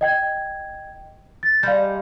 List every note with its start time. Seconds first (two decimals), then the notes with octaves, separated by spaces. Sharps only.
0.01 D#5 G5 G#6
1.43 A6
1.63 G3 G#3 F5 A#5 G6